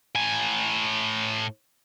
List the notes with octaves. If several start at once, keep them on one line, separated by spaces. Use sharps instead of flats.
A2 G#5